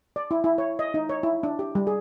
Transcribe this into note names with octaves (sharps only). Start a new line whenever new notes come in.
D5
E4
E4
C#5
D#5
D#4
C#5
E4
D4
G4
G3
G#4